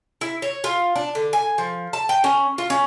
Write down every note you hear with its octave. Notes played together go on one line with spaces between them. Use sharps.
E4
C#5
F4
D4
D3
G#5
F3
A5
G5
C#4
F4
C#4